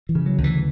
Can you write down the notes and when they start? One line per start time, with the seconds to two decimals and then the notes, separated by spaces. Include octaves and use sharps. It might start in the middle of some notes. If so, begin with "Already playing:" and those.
0.09 E3
0.15 C#3
0.26 F#3
0.38 D2
0.44 E3